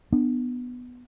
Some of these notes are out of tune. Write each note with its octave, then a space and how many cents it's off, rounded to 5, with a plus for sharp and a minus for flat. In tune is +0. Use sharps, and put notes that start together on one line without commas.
B3 +0 D4 +25